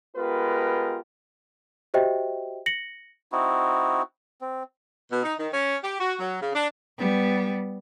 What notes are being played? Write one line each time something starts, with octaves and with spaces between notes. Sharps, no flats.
G#3 B3 F4 G4 A#4 B4
F#4 G4 C5 D#5 E5 G5
A#6 C#7 F#7
C4 D#4 E4 F#4
C4
B2
D#4
D#3
C#4
G4
F#4
F#3
C#3
D4
G3 B3